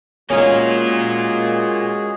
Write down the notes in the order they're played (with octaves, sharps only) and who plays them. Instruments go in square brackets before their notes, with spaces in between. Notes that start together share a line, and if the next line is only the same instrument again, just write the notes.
[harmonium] G#3 F#4 [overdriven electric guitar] A#3 F4 [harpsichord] C#4 D#4 [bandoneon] G#4